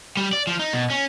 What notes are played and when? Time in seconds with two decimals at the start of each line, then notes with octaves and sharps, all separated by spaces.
0.17 G3
0.33 D5
0.47 F3
0.59 D#4
0.73 B2
0.90 C#4